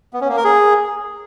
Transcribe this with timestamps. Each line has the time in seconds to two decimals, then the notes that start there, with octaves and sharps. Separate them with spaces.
0.13 B3
0.21 C#4
0.29 A#3
0.37 A#4
0.44 G#4